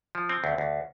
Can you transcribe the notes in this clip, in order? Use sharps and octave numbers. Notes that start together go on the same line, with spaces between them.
F3
C4
D2
D2